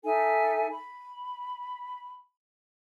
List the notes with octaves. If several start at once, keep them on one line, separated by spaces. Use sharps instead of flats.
D#4 A4 E5 G#5
B5